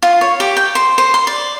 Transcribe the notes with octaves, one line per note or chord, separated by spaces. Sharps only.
F4
C#5
G4
G5
C5
C5
C6
D5